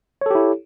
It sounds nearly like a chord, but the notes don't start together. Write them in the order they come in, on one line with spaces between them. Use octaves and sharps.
C#5 A4 G4 E4